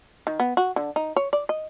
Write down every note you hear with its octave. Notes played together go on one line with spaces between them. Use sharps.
D#3
B3
F#4
D3
D#4
C#5
D5
D#5